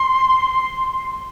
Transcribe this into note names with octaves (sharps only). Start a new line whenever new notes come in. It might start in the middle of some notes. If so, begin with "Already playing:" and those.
Already playing: C6